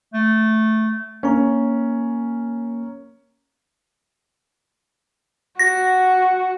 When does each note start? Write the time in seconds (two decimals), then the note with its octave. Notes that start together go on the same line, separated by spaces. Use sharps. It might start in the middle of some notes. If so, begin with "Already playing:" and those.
0.14 A3
1.23 A#3 C#4 A#5
5.59 F#4 A#6